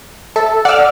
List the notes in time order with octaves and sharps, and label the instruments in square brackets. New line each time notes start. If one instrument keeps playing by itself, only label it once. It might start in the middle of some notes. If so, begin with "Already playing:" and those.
[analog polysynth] A4 [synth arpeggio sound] E5
[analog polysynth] D5 F6 [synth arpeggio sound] F#5 E6